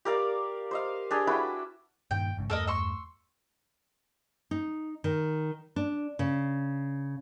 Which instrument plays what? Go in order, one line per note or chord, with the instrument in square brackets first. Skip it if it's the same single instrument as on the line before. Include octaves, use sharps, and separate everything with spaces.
[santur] G4 A#4 D5 F5
C5 D#5 F5
D4 G4 G#4
E4 F#4 B4 G5
[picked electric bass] G2 A#2 D#3 [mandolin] G5
[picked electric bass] A1 G#2 C#3
[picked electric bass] E2 G2 A3 [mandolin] A4 A#4 D#5
[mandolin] C6 C#6 E6
[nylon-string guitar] D#4
D#3
D4
C#3